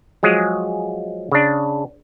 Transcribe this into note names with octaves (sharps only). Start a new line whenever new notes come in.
F3 F#3 G#3 G#4
C#3 D4